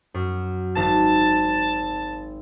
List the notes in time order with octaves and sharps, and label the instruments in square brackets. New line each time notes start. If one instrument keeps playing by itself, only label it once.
[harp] F#2
[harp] G#1 [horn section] A5